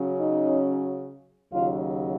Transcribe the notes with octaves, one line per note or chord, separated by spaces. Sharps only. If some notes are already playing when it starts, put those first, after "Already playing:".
Already playing: C#3 F#3 C#4
D#4
D#2 C#3 F#3 F4